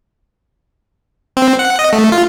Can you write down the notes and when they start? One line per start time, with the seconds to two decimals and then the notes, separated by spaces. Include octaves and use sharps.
1.37 C4
1.59 F#5
1.79 D#5
1.93 A3
2.12 F4